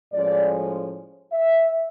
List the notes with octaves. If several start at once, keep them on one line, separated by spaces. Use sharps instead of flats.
A2 F3 G#3 C#4 D5
E5